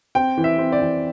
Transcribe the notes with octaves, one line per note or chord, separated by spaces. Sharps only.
C4 G5
E3
E5
C4
D5
E3